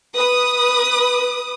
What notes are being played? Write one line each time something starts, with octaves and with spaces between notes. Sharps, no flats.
B4 D#6